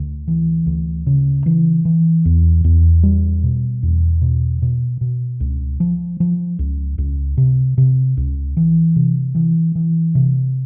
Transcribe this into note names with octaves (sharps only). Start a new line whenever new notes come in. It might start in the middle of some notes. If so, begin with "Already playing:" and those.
Already playing: D2
E3
D2
C#3
E3
E3
E2
E2
G3
B2
E2
B2
B2
B2
C#2
F3
F3
C#2
C#2
C3
C3
C#2
E3
C3
E3
E3
C3